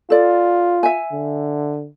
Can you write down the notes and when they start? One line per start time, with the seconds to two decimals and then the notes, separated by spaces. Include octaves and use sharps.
0.10 F4 A4 D5
0.83 E5 G#5
1.12 D3